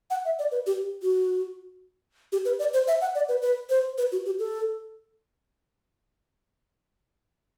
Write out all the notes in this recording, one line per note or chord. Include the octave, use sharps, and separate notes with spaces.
F#5
E5
D5
B4
G4
F#4
G4
B4
D5
C5
E5
F#5
D5
B4
B4
C5
B4
F#4
G4
A4